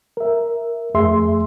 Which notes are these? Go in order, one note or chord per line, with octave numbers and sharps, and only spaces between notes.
A#4 E5
F2 A3 G#4 E5 C6